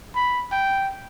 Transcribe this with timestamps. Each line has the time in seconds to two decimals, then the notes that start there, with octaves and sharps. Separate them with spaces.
0.15 B5
0.52 G5